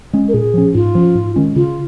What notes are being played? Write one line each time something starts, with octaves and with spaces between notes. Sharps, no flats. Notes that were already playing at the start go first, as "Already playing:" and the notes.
G#3 C#4
A#4
A#2 G#4
F3 C#4
G#2 F4
F3 C#4
G#2
D#3 G#3 C#4
C#3 F4